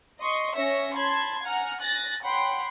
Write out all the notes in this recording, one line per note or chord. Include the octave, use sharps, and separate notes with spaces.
D#5 C6 C#6
C#4 C#5 E5 A#6 C#7
A5 B5 C6 G#6
F#5 G#5 A#5 F6
G#5 F#6 A6 A#6
C#5 F#5 G5 B5 C6